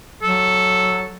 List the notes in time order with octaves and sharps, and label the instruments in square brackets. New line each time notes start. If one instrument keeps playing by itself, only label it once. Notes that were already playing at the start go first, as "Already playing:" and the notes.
[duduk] F#3 [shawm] A4